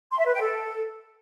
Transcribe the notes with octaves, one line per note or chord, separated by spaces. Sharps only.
C6
E5
B4
G5
A4